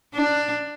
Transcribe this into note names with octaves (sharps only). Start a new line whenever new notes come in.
D4